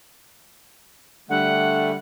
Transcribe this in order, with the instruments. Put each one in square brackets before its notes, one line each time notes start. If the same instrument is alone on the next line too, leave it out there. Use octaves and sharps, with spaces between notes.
[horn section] D3 G3 [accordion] A3 [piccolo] F#5